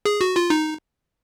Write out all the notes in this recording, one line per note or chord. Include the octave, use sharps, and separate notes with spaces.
G#4
F#4
F4
D#4